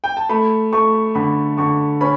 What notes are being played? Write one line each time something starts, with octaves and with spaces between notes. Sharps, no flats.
G5
A5
A3 B5
A3 C#6
D3 B5
D3 C#6
C#4 B5